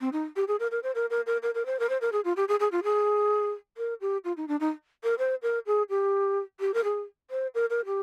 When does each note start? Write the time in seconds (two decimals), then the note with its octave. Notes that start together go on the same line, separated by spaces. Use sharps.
0.01 C4
0.13 D#4
0.36 G4
0.48 G#4
0.60 A#4
0.71 A#4
0.83 C5
0.95 A#4
1.10 A#4
1.26 A#4
1.43 A#4
1.55 A#4
1.66 C5
1.79 A#4
1.89 C5
2.01 A#4
2.12 G#4
2.25 F4
2.36 G4
2.48 G#4
2.60 G#4
2.72 F4
2.84 G#4
3.77 A#4
4.01 G4
4.24 F4
4.37 D#4
4.48 D4
4.60 D#4
5.04 A#4
5.19 C5
5.42 A#4
5.66 G#4
5.90 G4
6.60 G4
6.74 A#4
6.84 G#4
7.31 C5
7.55 A#4
7.70 A#4
7.86 G4